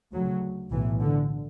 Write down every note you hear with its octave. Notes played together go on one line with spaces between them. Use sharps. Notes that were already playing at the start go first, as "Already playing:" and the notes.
D2 C#3 F#3
B1 A2 E3
D3